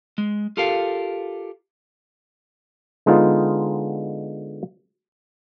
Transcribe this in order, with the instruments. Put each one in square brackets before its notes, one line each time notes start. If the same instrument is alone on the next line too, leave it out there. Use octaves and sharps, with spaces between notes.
[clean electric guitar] G#3
F4 G4 A4 A#4 F5
[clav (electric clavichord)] D3 G#3 B3 D#4 F4